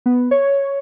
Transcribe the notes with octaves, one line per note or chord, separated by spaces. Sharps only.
B3
C#5